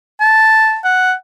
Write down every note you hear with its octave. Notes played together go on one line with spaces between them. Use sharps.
A5
F#5